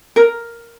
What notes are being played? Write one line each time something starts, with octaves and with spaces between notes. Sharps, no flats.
A#4